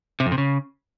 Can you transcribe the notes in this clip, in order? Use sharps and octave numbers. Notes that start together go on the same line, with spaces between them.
C3
F2
C3
C#3